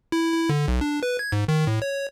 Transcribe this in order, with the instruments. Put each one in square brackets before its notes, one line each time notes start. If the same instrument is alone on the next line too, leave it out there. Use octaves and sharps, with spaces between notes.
[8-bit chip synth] E4
E4
D3
B1
D4
B4
G#6
G#2
D#3
A2
C#5